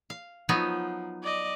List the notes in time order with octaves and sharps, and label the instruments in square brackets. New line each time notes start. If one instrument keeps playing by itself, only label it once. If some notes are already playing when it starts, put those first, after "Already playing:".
[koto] F5
[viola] F3 [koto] F#3 B3 D#4
[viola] D5 D#5